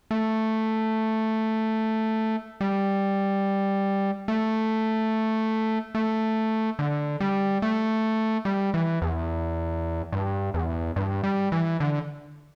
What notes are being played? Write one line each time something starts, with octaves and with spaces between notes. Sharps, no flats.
A3
G3
A3
A3
D3
G3
A3
G3
E3
E2
G2
E2
G2
G3
E3
D3